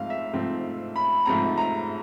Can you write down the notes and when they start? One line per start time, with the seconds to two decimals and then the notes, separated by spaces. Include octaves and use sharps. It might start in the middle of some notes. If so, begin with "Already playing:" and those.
Already playing: G#2 F3 A3 C4 F5
0.10 E5
0.33 G#2 F3 A3 C4
0.96 B5
1.26 G#2 F3 A3 C4 A#5
1.58 A#5